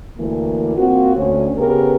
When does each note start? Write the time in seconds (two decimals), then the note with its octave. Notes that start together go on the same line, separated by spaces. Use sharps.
0.18 D2 E3 A#3
0.77 A#3 C4 F4 F#4
1.15 D2 C#4
1.57 C#3 B3 G4 A#4 B4